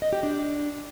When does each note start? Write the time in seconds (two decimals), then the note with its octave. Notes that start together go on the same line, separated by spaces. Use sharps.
0.02 D#5
0.13 G4
0.23 D4